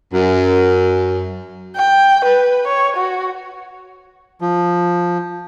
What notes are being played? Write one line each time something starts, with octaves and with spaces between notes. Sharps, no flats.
F#2
G5
B4
C#5
F#4
F3